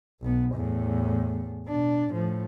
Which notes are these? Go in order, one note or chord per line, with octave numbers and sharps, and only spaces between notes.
B1 B3
E2 A2
B2 D4
A2 F3